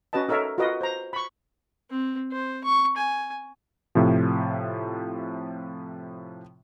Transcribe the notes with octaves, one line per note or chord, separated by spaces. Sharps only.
C#4 F#4 B4 D#5 A5
D#4 A4 A#4 C#5 E5
F4 F#4 A#4 B4 D#5
C5 A#5
B5 C#6
C4
C5
C#6
G#5
A2 C3 F3